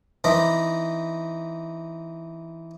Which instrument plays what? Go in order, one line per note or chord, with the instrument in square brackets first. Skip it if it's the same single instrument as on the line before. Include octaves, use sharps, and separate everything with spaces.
[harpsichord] E3 C4 D#4 B5 D6